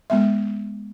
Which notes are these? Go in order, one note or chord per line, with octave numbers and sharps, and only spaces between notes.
G#3 B3 E5